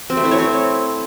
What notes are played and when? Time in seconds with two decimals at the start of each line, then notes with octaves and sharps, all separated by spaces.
0.10 C4
0.17 A3
0.24 E4
0.31 C#5
0.39 C4